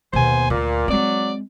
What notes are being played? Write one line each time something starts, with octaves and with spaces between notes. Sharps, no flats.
D#2 B2 B3 C5 G#5
D2 A#2
F#3 G#3 C4 D5